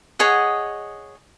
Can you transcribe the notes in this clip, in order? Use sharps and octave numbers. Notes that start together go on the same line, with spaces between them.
G#4 C#5 D#5 F#5